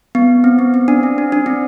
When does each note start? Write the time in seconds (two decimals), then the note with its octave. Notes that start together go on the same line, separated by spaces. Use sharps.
0.15 B3
0.44 C4
0.59 B3
0.74 C4
0.88 D4
1.03 C4
1.18 D4
1.32 D4
1.46 C4